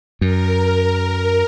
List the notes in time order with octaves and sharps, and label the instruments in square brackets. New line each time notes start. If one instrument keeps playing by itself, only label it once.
[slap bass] F#2 [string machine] A#4